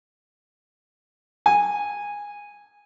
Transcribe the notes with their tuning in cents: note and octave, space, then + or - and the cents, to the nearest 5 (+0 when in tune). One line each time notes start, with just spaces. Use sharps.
G#5 -15